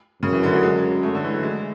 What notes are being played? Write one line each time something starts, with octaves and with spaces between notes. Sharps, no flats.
F#2 C#3
E3
D3
F#3
G#3
A3
D3
E3
F#3
G#3